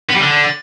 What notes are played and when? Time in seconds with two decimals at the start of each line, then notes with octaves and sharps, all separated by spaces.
0.09 B3
0.15 G3
0.20 D3